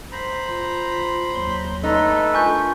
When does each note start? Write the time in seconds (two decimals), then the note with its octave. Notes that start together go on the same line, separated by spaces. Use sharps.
0.12 C5 A#5 B5
0.48 F4
1.35 D#2 F#3 C6
1.84 A3 D#4 A4 B4
2.34 D4 F4 A#4 G#5 C#6 G6